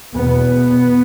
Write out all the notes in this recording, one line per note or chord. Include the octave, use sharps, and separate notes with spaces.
E2 B2 B3